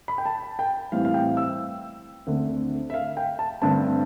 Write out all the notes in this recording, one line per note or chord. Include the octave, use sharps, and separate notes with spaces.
B5
G5
A5
G5
A2 E3 G3 C4 F5
F5
G5
E6
D2 D3 A3 C4
E5
F5
G5
A5
G2 D3 A3 C4 A5